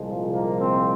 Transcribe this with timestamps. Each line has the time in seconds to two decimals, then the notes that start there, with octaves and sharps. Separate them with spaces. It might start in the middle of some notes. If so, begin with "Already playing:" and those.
Already playing: C2 A#2 F3 G#3
0.32 A#3
0.61 C4